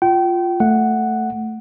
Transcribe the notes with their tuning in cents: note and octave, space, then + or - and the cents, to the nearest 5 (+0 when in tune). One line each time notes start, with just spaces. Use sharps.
F4 +0 G5 -30
A3 +5 F#5 +0